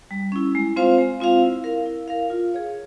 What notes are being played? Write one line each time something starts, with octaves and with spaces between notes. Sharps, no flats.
G3
C#4 E4
G#3
C4 F4 C5 F5
G#3
C4 F4 C5 F5
E4
A#4 F5
E4
A#4 F5
F4
G#4 C#5 F5